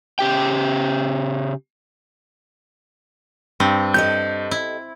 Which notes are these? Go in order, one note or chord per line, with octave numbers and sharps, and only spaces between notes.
C#3 G4 G5
G2 C4
G4 A4 D#5 G6
E4